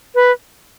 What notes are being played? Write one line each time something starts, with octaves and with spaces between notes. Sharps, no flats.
B4